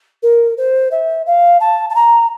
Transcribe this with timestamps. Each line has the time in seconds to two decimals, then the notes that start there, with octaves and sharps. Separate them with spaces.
0.23 A#4
0.58 C5
0.91 E5
1.26 F5
1.60 A5
1.90 A5
1.95 A#5